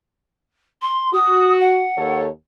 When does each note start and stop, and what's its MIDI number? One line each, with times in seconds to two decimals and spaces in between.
0.82 1.13 84
1.13 1.84 66
1.13 1.54 87
1.61 2.20 78
1.97 2.27 39
1.97 2.27 69
1.97 2.27 73